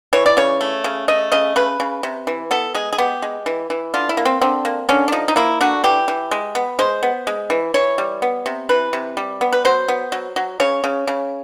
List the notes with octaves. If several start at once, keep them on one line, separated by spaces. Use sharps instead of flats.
E3 C#5
D5
C#3 C#5
A3
C#3
A3 D#5
C#3 D#5
C#3 B4
C#3
C3
E3
B3 A4
G#3 G#4
G#4
B3 G4
G#3
E3
E3
D3 F4
E4
A#3
C4
D3 C4
A#3
D3 C#4
D4
F3 D#4
D#4
A#3 E4
D3 F#4
E3 G4
E3
G#3
B3
G#3 C5
B3
G#3
E3
E3 C#5
G3
B3
C3
E3 B4
C3
G3
B3
B4
F#3 C5
B3
F#3
F#3
C#3 C#5
C#3
C#3